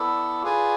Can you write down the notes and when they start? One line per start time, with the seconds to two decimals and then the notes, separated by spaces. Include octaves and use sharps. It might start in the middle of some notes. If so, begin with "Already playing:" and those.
Already playing: B3 E4 A4 D5
0.43 F4 G#4 B4 D5 G#5